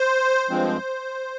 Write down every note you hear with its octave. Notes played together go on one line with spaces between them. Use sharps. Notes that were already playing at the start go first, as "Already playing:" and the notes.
Already playing: C5
G2 F3 G#3 C4